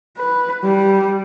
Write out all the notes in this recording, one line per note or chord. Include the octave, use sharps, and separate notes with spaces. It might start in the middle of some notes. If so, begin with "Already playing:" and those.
B4
G3